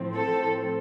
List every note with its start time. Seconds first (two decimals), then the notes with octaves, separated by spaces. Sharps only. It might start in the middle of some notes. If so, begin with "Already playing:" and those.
Already playing: A2 F3 C4
0.14 A4